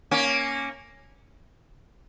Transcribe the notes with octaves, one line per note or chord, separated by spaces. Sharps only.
A#3 C#4